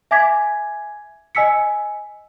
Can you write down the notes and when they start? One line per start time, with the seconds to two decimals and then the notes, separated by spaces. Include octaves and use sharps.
0.11 E5 G#5 D6 G#6 B6
1.35 D#5 G#5 E6 B6 C#7